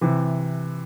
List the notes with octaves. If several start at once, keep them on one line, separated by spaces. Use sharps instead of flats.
C3 E3